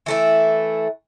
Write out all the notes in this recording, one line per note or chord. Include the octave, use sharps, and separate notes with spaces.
E3 A3 E4